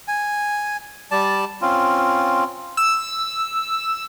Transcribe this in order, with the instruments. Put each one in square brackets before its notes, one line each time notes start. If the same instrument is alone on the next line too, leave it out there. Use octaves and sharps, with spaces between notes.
[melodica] G#5
G3 D5 A5
C4 C#4 F4
[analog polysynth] E6